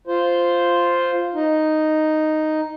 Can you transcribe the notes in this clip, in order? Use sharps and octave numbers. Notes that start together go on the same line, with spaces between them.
F4 C5
D#4